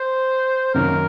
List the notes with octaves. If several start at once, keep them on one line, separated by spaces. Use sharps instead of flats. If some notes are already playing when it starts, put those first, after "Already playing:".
Already playing: C5
F#2 D#3 A#3 C#4 A#4